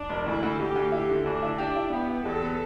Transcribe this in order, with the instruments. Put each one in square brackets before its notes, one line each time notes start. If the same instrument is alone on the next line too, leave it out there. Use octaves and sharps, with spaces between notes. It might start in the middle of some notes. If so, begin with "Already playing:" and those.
Already playing: [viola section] D4
[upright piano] E1
[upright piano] D2 [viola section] E4
[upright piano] D2
[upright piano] D2 [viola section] G4
[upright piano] D2
[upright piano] E4 [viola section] G4
[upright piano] D3
[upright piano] D2 [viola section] D4
[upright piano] E4
[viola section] D4 [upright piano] G4
[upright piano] E4
[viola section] B3 [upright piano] G4
[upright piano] G4
[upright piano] E2 [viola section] A4
[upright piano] B3